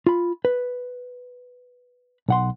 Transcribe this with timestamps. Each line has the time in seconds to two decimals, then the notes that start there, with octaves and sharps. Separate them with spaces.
0.07 F4 B5
0.45 B4
2.29 B1 F#5 C6